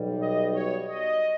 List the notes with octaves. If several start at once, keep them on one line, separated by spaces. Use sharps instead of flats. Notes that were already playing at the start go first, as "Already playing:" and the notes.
Already playing: B1 B2 G3
D#5
C#5
D#5